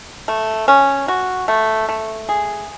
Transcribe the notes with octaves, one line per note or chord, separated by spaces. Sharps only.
A3
C#4
F#4
A3
A3
G#4